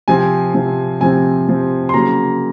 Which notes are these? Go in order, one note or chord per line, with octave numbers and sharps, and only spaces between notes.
C3 F3 C4 G#5
C3 F3 C4
C3 F3 C4 G#5
C3 F3 C4
C6
C#3 F#3 A#3 A#5